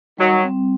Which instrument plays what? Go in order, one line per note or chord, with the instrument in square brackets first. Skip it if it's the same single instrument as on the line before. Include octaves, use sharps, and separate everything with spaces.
[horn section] D#3 F#3 [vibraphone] G3
[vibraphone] C4